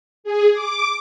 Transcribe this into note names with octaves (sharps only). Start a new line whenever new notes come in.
G#4
D6